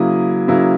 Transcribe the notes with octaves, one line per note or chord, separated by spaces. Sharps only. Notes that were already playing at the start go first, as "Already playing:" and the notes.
Already playing: C#3 F#3 A#3 E4 D#6
C#3 F#3 A#3 E4